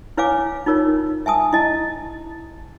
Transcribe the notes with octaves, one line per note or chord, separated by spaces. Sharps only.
E4 B4 C#5 F5 G#5 D6
D#4 F4 A#4 C#5
E5 G#5 A5 D#6
E4 D#5 A5